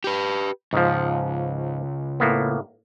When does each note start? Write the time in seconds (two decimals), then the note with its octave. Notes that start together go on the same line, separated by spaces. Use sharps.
0.04 G4 B4
0.73 C#2 G#2 F3
2.20 A2 A#3 B3